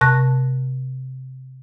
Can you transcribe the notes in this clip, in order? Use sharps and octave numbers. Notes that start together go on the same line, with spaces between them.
C3 A5 F#6 A#6